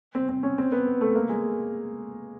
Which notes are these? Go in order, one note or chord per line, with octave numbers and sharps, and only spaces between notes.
C4
C4
C#4
C4
B3
A3
A#3
G#3